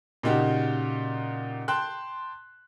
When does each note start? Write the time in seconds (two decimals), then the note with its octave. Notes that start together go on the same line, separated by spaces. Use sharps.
0.23 A#2 C#3 D#4 F#4 G4
1.68 G5 A5 C6 F#6